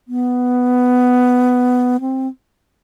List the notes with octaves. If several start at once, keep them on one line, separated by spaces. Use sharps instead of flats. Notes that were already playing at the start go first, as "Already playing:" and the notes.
B3
C4